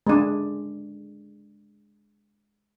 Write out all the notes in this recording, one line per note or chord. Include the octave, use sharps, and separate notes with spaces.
G#3 D4